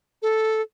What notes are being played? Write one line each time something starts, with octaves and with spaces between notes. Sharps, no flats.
A4